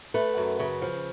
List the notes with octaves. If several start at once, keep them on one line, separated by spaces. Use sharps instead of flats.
A3 B4
F#2
C#3
F3